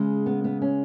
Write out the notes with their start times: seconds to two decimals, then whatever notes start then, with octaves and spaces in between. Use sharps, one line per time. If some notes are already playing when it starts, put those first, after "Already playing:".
Already playing: C#3 G#3
0.26 B3
0.44 B3
0.62 C#4